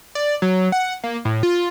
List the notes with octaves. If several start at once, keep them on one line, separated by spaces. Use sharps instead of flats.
D5
F#3
F#5
A#3
A2
F4